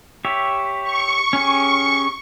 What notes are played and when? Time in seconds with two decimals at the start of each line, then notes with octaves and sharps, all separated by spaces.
0.25 G4 C#5 E5
0.84 C#6
1.33 C#4 G4 G#4